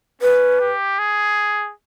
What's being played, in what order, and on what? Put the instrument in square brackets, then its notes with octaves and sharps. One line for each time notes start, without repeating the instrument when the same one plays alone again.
[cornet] C#4 [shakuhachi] B4
[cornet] G4
G#4